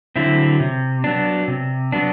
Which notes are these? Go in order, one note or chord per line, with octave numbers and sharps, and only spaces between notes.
D3 F#3 C4 E4
C3
F#3 B3 D4
C3
F#3 B3 D4